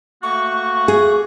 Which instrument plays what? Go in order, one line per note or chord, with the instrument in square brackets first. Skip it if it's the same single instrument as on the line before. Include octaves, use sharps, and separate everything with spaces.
[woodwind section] A3 A#3 F#4 [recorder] C#6
[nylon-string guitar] G#4